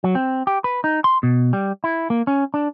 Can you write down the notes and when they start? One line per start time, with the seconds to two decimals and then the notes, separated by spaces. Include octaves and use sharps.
0.04 F#3
0.15 C4
0.47 G4
0.64 B4
0.84 D#4
1.04 C6
1.23 B2
1.53 G3
1.84 E4
2.10 A#3
2.27 C#4
2.54 D4